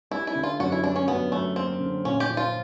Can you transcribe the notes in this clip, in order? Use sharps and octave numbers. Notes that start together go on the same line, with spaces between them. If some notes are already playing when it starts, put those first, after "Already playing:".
G3 E4
E4
D3
F4
F#2 F#4
E4
G3 D4
C#4
F#2 B3
F#2 A3
A#3 C4
D3
A#2 C#4
G4
F3
F4